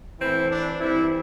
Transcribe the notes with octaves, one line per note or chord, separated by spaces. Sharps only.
A2 E3 C4 E4
D4
G2 E3 C4 E4